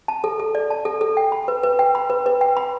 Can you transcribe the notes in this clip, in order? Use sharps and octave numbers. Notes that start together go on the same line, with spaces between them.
A5
A4
A4
D5
A5
A4
A4
G5
B5
B4
B4
G5
B5
B4
B4
G5
B5